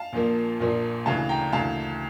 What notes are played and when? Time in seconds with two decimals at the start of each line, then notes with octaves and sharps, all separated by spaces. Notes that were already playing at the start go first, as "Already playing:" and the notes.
Already playing: F5 A5
0.13 A#1 A#2 F3 A#3
0.60 A#1 A#2 F3 A#3
1.06 D2 C#3 E3 F5 A5
1.29 G5 A#5
1.52 D2 C#3 E3 F5 A5